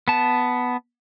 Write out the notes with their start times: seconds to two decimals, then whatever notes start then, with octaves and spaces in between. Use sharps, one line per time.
0.08 B3 A5